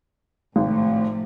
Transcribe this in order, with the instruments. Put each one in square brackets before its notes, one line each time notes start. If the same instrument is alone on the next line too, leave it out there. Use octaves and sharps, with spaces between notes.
[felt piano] G#1 [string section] A2 C3 F3